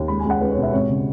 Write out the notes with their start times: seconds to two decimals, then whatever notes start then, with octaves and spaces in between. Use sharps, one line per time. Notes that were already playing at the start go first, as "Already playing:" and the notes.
Already playing: D#2
0.08 C#2 B5
0.19 G#5
0.25 C#2 F#5
0.41 C#2 B4
0.52 C#5
0.57 B2
0.63 E5
0.73 G#1 C#5
0.89 C#3